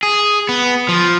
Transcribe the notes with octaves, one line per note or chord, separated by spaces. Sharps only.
G#4
B3
F3